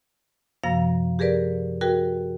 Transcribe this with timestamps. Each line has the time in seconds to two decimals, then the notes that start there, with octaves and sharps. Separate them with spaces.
0.63 F#2 C3 F3 A#3 F5 A#6
1.19 G4 G#4 A#4 B4 D5
1.81 F#4 G#4 A#4 B4 G5